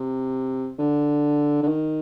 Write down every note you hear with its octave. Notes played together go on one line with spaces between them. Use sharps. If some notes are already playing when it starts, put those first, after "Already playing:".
Already playing: C3
D3
D3
D#3